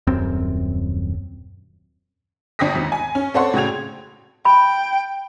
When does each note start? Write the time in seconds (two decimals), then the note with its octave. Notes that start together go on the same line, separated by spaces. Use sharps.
0.07 D#1 F#2 C4
2.59 G1 D4 G5 D#6 A#6 B6
2.74 G#1 D#2
2.92 G#5
3.15 C#4
3.34 C4 A4 C#5 D5 F#5 C6
3.54 A2 C#3 F#4 G5 G#6 F7
4.45 G5 B5